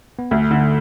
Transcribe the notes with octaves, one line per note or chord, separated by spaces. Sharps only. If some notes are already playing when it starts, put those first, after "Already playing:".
B3
D2 A3
D3